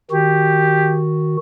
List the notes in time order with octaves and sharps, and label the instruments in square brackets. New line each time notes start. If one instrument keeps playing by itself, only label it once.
[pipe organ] D#3 F#4 [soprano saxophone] G4